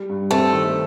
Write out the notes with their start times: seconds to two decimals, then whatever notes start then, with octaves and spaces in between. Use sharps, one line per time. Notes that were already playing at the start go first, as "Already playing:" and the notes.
Already playing: G3
0.09 G2
0.31 A3 C4
0.53 D#3